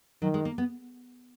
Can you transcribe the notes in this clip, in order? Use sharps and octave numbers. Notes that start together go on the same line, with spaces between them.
D#3 F#3
G#3
A#3
B3